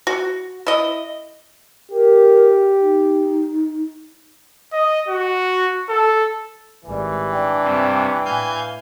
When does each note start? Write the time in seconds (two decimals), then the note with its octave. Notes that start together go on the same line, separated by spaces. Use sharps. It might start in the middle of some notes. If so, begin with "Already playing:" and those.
0.07 F#4
0.67 E4 D#5
1.91 G4 A#4
2.80 D#4
4.72 D#5
5.08 F#4
5.89 A4
6.85 G#1 E3 G3
7.32 D4 G5
7.63 G2 C3
8.25 A2 F5 G#5 G6